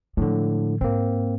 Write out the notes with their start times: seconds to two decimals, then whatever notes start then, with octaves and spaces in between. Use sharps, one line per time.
0.17 A2 D3 F3 G#3
0.81 G#2 A#3 C4